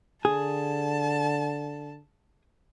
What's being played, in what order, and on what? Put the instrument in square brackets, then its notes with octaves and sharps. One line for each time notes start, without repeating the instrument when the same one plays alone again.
[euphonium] D3 [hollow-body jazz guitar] G#4 [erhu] A5